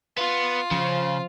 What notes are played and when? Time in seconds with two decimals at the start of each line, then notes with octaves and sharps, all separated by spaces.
0.17 B3 F4
0.71 C#3 F3